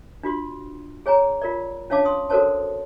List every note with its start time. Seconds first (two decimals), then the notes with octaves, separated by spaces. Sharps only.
0.23 D4 F4 F#4 C6
1.06 G#4 C#5 G#5 A#5
1.42 F4 A#4 D5
1.90 C#4 D4 C#5 F5 A5 D6
2.05 C6 D#6
2.30 F#4 A4 A#4 C5 C#5 A5